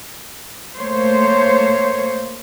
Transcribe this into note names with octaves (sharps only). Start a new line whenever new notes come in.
A3 A#3 C5 C#5